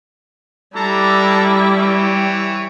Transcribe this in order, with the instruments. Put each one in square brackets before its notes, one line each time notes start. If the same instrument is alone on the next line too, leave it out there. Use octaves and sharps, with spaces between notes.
[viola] G3 E4 [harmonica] D4 A4 A#5
[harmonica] E3 C#5 G5